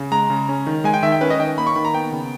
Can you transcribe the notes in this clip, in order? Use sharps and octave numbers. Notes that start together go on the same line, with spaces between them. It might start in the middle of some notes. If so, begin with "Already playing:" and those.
Already playing: C#3
G#3 A#5
C#3
C#4
D#3
G#3 G#5
G5
D#3 E5
G5
C#4 B4
D#5
D#3 G5
A#3 B5
C#6
D#3 B5
A#5
B3 G5
C#3